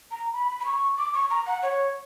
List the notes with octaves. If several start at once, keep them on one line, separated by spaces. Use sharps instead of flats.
A#5
B5
B5
C#6
D6
C#6
A#5
F#5
C#5